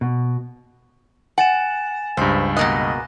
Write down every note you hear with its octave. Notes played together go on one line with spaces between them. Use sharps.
B2
F#5 G#5 A6 E7
C#2 G2 C5
B2 A#3 D#5 F#6 A#6